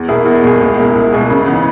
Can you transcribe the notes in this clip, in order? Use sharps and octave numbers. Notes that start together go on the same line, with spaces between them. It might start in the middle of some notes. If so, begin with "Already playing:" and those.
Already playing: E2
B2 A#3 E4 G#4
E2
B2 A#3 E4 G#4
C#2
B2 A#3 E4 G#4
C#2
B2 A#3 E4 G#4
C#3
E3 B3 D#4